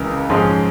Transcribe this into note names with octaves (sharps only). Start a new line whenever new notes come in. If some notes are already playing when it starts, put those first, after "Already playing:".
Already playing: C#2 C#3 E3 A#4
G#2 F3 G#3 C#4